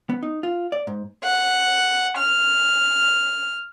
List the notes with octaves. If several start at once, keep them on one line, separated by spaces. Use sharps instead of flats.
B3
D#4
F4
D5
G#2
F#5
F6